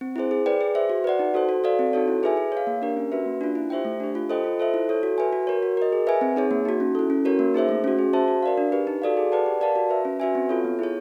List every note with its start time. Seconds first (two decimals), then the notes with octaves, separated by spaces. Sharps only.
0.01 C4
0.16 E4 G#4 C5
0.31 G#4
0.46 B4 D5 G5
0.61 G#4
0.75 C5 E5
0.90 F#4
1.04 B4 D5 F#5
1.19 D#4
1.34 F#4 A4 C5
1.49 F#4
1.64 A4 D5 F5
1.79 C4
1.93 D#4 F#4 A4 C#5
2.08 E4
2.23 G#4 B4 E5 G#5
2.37 G#4
2.52 C#5 F5
2.67 A#3
2.82 D4 G4 A#4
2.97 C#4
3.12 F#4 B4 E5
3.26 A#3
3.41 D4 F4
3.55 E4
3.70 G4 C5 E5 G5
3.85 A3
4.00 D4 G4
4.15 F4
4.29 A4 C5 D#5 G5
4.44 F4
4.59 A4 C5 E5
4.74 E4
4.89 A4 C#5
5.03 F#4
5.18 B4 E5 G#5
5.33 F#4
5.47 A#4 C#5
5.62 F#4
5.77 A#4 D#5
5.92 G#4
6.07 B4 E5 G#5
6.21 C4
6.36 D#4 G#4 C#5
6.51 A#3
6.65 D#4 F#4
6.80 C#4
6.95 E4 A4
7.10 C#4
7.25 F#4 A#4 C#5
7.39 A#3
7.54 D#4 G#4 C5 E5
7.69 A3
7.84 C#4 F#4
7.99 G#4
8.13 C5 E5 A5
8.28 F#4
8.43 A#4 D5 F5
8.57 D4
8.72 G4 B4
8.87 D#4
9.02 F#4 A4 D5 F5
9.17 G#4
9.32 B4 D5 F#5 A5
9.46 G4
9.61 A#4 D5 F5 A5
9.76 F#4
9.90 B4 E5
10.05 C#4
10.20 F#4 B4 E5 G#5
10.35 C4
10.49 F4 A4 C#5
10.65 B3
10.79 E4 G#4 C#5